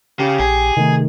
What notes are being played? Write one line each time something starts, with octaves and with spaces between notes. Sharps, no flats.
C#3 G4
A#1 G#4
C3 D#3 A3 D#4